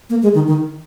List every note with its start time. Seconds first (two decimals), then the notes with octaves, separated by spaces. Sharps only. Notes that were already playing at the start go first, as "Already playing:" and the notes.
0.10 A#3
0.23 G#3
0.35 D#3
0.48 D#3